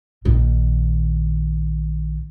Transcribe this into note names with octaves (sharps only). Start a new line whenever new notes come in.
A#1 D#3